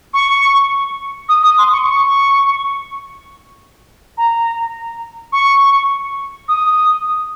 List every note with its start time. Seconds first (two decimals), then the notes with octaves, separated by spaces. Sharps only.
0.14 C#6
1.29 D#6
1.43 D#6
1.58 C6
1.72 C#6
1.87 C#6
4.17 A#5
5.32 C#6
6.48 D#6